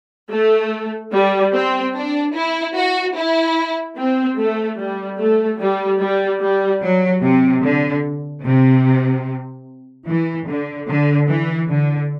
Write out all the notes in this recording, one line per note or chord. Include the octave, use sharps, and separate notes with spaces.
A3
G3
C4
D4
E4
F#4
E4
C4
A3
G3
A3
G3
G3
G3
F#3
C3
D3
C3
E3
D3
D3
E3
D3